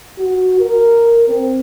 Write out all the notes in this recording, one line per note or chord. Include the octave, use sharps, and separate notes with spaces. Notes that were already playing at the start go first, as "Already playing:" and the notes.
F#4
A#4
C4